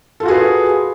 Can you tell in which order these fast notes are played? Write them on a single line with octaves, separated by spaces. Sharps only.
A4 F4 F#4 G#4 B4